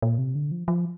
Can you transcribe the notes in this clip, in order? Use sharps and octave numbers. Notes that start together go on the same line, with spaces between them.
A#2
C3
D3
F3
F3